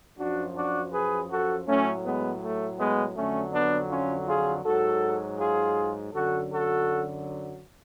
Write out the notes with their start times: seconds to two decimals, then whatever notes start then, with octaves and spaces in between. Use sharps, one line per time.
0.18 F#2 F3 D4 F#4
0.55 D4 F#4
0.93 G#4 B4
1.30 F#4 A4
1.67 A2 F#3 A3 C#4
2.05 G#3 B3
2.42 A3
2.79 G#3 B3
3.16 F2 D3 F#3 A3 C#4
3.53 B3 D4
3.91 C#4 F4
4.27 F4 G#4
4.65 G#2 F#3 F#4 A4
5.39 F4 G#4
6.13 F#2 D3 F#3 F#4 A4
6.51 F#4 A4